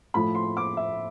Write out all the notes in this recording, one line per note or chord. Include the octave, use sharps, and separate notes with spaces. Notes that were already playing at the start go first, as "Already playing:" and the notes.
A2 F3 A3 B5
C6
D6
E5